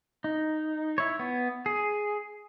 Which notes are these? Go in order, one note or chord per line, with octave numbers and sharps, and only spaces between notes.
D#4
E4 C#5
B3
G#4